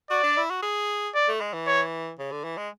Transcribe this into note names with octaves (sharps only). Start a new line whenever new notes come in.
F#4 D5
D4
E4
F#4
G#4
D5
A3
G#3
E3
C#5
C#3
D3
E3
G#3